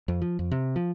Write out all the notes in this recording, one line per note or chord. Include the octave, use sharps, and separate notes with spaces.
F2
F3
F2
C3
F3